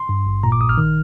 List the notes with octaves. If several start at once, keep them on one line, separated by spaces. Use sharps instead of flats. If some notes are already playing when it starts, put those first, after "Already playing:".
Already playing: C6
G2
G#1
A#2 A#5
D6
A#1 D#6
F6
D#3